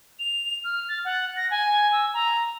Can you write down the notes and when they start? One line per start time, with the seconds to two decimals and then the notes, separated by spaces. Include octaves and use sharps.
0.19 F7
0.64 F6
0.89 A6
1.05 F#5
1.37 A#6
1.51 G#5
1.92 E6
2.14 A#5